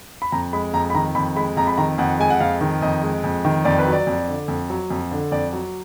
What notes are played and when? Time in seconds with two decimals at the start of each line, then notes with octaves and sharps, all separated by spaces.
0.22 B5
0.32 F2 A#5
0.53 G#3 B5
0.74 F2 A#5
0.90 B5
0.95 D#3 A#5
1.15 F2 B5
1.36 G#3 B5
1.57 F2 A#5
1.67 B5
1.78 D#3 A#5
1.98 F2 F#5
2.19 G#3 G#5
2.30 F#5
2.41 F2 F5
2.61 D#3
2.82 F2 D#5
3.03 G#3
3.24 F2
3.45 D#3
3.65 F2 D5
3.79 B4
3.86 F#3
3.93 D5
4.07 F2
4.28 D3
4.48 F2
4.70 F#3
4.90 F2
5.11 D3
5.32 F2 D5
5.53 F#3